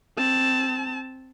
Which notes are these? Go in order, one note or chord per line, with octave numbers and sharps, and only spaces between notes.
C4 A5